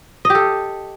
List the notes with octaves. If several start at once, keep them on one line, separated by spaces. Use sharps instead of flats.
D#5
G4
A4